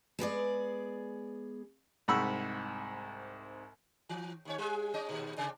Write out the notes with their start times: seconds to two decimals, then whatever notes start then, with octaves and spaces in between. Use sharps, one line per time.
0.19 G#3 B3 G#4 D5
2.08 C2 G#2 F#5 B5 C#6 E6
4.09 E3
4.45 D#2 C#4 C#5
4.58 G3 G#4
4.94 G#3 C#4 D#5
5.09 D#2 A#2
5.37 C3 D4